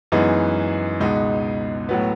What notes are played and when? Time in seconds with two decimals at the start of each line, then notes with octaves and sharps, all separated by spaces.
0.12 F#2 E3 G#3 B3 D#4
1.00 C#2 B2 G#3 D#4
1.89 A2 F#3 B3